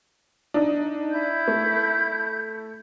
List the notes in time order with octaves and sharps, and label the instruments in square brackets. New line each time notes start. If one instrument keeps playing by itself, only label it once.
[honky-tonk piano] D4 D#4
[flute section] E4 G6
[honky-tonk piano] A3